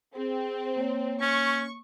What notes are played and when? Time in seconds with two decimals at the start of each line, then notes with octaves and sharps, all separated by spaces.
0.15 C4 G#4
0.76 A#3 C#5
1.21 C#4 C#6